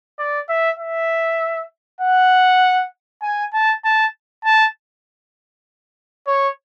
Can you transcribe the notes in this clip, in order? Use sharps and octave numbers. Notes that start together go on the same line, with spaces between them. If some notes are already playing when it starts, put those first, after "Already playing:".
D5
E5
E5
F#5
G#5
A5
A5
A5
C#5